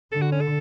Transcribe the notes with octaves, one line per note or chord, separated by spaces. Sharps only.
D3 A4
F#4
C#4
A4